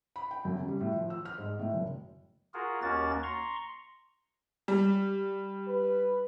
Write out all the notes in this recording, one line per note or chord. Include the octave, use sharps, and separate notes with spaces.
B5
G5
F#2
C#3
G3
A2
F3
E6
F6
G#2
A2
F#1
F4 F#4 G#4 A#4
D#2 A#3 C#4 F#4 A#4 A6
A#5 C6 C#6
G3
B4